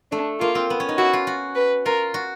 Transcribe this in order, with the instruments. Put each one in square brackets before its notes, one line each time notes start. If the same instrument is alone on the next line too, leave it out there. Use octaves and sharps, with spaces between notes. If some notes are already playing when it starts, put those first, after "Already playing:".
[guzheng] A3 [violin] D4
[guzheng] A#3 [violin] F4
[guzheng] C4
B3
C#4
D#4
[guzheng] E4 [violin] F#4
[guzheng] F4
F#4
[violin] B4
[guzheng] F4 [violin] A#4
[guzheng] F#4